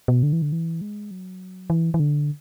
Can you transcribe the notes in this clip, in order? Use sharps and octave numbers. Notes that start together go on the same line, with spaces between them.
B2
D3
E3
D3
E3
G#3
F#3
E3
E3
D3